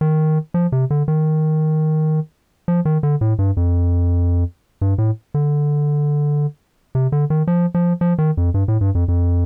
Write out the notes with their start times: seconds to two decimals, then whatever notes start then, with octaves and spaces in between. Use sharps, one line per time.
0.01 D#3
0.54 F3
0.72 C3
0.90 D3
1.08 D#3
2.68 F3
2.85 D#3
3.03 D3
3.21 A2
3.39 G2
3.57 F2
4.81 G2
4.98 A2
5.34 D3
6.95 C3
7.12 D3
7.30 D#3
7.47 F3
7.74 F3
8.01 F3
8.18 D#3
8.37 F2
8.54 G2
8.68 A2
8.81 G2
8.95 F2
9.08 F2